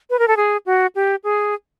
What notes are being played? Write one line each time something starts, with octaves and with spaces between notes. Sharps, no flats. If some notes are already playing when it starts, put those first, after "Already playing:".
B4
A#4
A4
G#4
F#4
G4
G#4